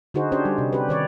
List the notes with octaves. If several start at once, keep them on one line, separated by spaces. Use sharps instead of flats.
D3 D#4 F#4 G#4 C5
C#4 D4 G4 C5 C#5
G3
C3
G4 B4
D#3 C#5 D5